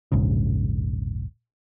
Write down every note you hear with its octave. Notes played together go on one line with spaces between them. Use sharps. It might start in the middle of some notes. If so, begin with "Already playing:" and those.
E1 A#1 G#2 C#3